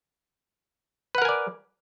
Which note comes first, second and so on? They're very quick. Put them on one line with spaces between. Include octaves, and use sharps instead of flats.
B4 F#5 A#4 G#5 D5